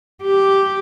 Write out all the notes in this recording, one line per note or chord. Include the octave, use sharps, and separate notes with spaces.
G4